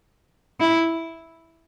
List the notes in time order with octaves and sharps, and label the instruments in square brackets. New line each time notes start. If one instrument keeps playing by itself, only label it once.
[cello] E4